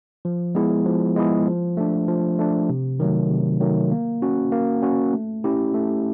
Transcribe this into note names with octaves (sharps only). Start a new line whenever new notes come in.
F3
G#3 B3 E4 G#4
F3
G#3 B3 E4 G#4
F3
A3 D4
F3
A3 D4
C3
D#3 F#3 A3
C3
D#3 F#3 A3
A#3
C#4 F#4
A#3
C#4 F#4
A3
C#4 E4 G4
A3